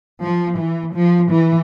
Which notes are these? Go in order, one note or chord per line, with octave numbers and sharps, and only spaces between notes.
F3
E3
F3
E3